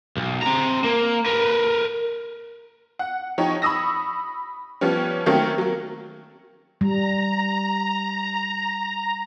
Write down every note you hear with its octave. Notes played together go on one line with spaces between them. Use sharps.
B1
C4 A#5
A#3
A#4 B4
F#5
F3 D#4 G4 C#5
B5 C#6 D#6 E6 A#6
F3 G3 B3 C#4
D#3 F#3 A3 A#3 C4 C#4
F#3 A#3
G3 A#5